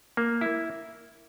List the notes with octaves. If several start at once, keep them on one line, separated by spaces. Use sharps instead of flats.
A#3
E4